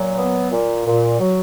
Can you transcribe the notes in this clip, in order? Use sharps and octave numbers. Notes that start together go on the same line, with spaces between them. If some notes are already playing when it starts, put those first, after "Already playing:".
Already playing: A#2 F#3
B3
A#2
A#2
F#3